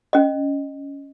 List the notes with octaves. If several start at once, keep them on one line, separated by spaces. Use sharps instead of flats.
C#4 D#5